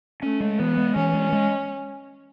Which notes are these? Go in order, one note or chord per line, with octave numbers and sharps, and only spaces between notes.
A3 C#4
G#3
E3 B3
G#3
E3 C#4
G#3
G#3